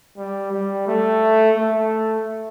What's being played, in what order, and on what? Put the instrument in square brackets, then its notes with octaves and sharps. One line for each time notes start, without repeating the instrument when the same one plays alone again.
[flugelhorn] G3
G3
A3
A3